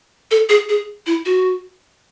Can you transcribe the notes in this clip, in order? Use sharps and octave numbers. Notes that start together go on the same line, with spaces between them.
A4
G#4
G#4
E4
F#4